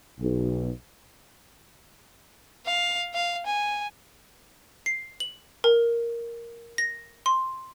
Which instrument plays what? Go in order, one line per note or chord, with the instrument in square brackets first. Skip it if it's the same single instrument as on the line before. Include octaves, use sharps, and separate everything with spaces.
[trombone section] B1
[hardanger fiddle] F5
F5
G#5
[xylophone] C7
F#7
A#4
A#6
C6